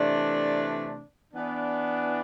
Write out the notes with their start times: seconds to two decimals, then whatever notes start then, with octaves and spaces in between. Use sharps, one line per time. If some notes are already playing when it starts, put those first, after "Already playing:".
Already playing: C3 E3 A3 D4
1.34 E3 B3 D4